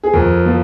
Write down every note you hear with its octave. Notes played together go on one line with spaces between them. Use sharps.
G#4
F2 A#4
F3